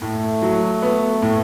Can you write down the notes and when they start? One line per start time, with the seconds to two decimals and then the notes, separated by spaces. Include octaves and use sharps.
0.02 A2 A3
0.42 F#3
0.82 B3
1.22 A2